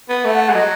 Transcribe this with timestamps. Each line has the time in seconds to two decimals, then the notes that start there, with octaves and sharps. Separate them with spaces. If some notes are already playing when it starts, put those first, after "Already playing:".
0.09 B3
0.24 A3 E5
0.34 F#5
0.45 F#5
0.50 G#3
0.54 F#3 D#5